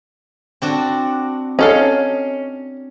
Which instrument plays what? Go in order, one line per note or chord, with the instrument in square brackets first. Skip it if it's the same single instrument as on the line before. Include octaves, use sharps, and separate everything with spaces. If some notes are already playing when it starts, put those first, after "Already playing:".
[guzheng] C4 D4 F#4
[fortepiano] C#4 [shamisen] D#4 A4 F5